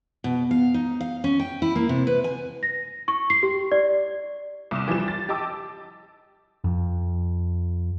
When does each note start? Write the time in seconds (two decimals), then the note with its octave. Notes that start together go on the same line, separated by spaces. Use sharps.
0.24 B2
0.51 F5
0.74 D#4
1.01 F5
1.24 C#4
1.40 G5
1.62 E4
1.76 A#3
1.89 C3
2.07 B4
2.24 G#5
2.63 A#6
3.08 C#6
3.30 C7
3.43 G4
3.72 D5
4.71 C2 D6 E7
4.88 E3 F3 G3 E7
5.08 A6
5.29 G4 D#5 A5 D6 E6
6.64 F2